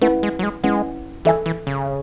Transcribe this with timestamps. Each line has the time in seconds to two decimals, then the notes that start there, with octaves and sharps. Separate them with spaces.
0.01 A3 C#4 E4 B4 F#5
0.23 G#3
0.39 F#3
0.43 G#3
0.64 G#3 C#4 E4 B4 F#5
1.25 E3 A4 E5 G#5
1.46 E3
1.67 C#3